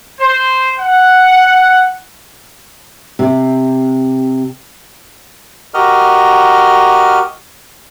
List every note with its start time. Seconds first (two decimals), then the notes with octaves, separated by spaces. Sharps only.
0.20 C5
0.79 F#5
3.19 C3
5.74 F#4 G4 A#4 D#5 F6